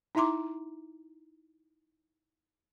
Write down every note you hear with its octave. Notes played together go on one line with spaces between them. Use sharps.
D#4 E4 E5 A#5 C6 D6